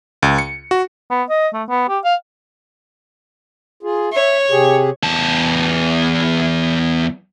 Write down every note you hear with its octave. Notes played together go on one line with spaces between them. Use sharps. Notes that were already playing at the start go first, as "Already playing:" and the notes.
C#2
C#7
F#4
B3
D#5
A3
B3
G4
F5
F4 G#4
C#5 E5
C3 G4 G#4
E2 A5